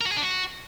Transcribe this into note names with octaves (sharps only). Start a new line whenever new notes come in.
A#4
F#4
G#4
D4
F#4